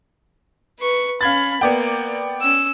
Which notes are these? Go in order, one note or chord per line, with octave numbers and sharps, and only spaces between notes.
B4 C#6
C#4 F5 B5 G#6 A6
A#3 B3 D5 G5
C#4 E6